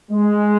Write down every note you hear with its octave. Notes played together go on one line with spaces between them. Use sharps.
G#3